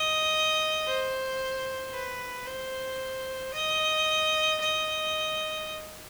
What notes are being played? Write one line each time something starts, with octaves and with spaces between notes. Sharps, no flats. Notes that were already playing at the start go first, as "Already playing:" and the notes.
Already playing: D#5
C5
B4
C5
D#5
D#5